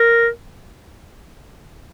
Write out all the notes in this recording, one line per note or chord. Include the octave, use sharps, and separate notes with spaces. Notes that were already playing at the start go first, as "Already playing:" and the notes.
Already playing: A#4